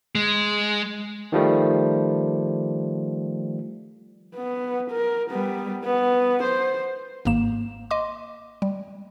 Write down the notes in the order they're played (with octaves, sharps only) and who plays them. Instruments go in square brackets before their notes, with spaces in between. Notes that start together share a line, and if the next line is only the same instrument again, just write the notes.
[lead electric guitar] G#3
[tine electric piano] D#3 F3 G3 A3
[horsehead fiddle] B3
A#4
G3 B3
B3
C5
[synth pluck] G#1 G#2 A#3 E7
D#5 C6 D6
G3